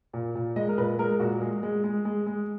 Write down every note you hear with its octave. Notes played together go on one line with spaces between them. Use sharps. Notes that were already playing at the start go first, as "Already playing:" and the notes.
A#2
A#2
G#3 D#5
A#4
A#2 B4
G#3 A#4
A#2 F#4
G#3 G#4
G#3
G#3
G#3
G#3